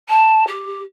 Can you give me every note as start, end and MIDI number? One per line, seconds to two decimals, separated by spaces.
0.09 0.44 81
0.47 0.81 67